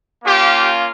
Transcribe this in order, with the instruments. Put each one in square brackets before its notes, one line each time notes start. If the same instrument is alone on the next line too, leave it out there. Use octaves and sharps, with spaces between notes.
[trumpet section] A#3 C#4 F4 G4